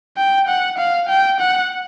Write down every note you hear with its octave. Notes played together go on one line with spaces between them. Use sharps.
G5
F#5
F5
G5
F#5